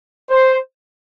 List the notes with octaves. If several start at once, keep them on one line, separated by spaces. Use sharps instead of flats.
C5